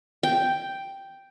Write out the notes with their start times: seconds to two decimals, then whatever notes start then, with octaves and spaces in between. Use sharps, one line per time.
0.23 G5